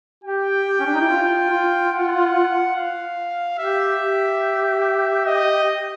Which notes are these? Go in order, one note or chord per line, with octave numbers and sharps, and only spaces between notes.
G4 G5
G4
C#4
D4
D#4
E4
F4
F4
F#5
F5
G4 E5
G4
D#5